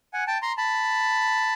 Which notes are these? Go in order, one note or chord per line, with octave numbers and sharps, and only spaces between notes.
F#5 G#5
G5 A5
A#5 C6
A5 B5